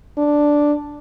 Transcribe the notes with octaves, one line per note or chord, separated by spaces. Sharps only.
D4